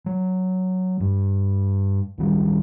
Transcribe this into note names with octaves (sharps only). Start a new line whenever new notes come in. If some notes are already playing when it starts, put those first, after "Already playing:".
F#3
G2
C#2 D#3 G3